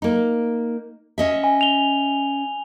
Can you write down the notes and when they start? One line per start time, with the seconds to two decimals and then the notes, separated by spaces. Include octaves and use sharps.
0.02 A#3 D#4
1.18 C#4 D#5 E5
1.44 G#5
1.61 F7 G7